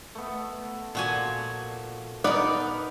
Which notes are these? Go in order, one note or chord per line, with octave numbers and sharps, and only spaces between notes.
A3 B3
A#2 F3 F#4 G#5 D6
B3 D#4 A#4 D5